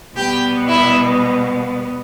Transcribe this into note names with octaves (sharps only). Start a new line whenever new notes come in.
B2 G3 B3 G4 G5
E4 E5